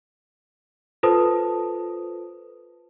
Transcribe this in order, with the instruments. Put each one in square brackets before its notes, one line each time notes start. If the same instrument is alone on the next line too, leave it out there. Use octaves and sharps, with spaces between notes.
[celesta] F4 A4 B4 C5 A5 D#6